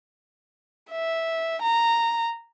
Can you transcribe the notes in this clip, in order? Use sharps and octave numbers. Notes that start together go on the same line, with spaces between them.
E5
A#5